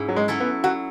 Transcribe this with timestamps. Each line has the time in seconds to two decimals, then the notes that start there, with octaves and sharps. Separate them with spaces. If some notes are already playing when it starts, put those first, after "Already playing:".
Already playing: G#2 C#4 E4
0.09 F#3
0.16 G#3
0.28 F#3 C#4 E4 A4
0.40 B3
0.64 F#3 F#4